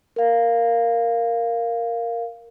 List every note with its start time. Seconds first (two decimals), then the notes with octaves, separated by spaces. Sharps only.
0.16 A#4 F5